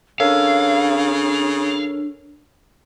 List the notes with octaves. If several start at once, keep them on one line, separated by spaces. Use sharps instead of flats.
C#3 D4 A4 A#4 C#5 F5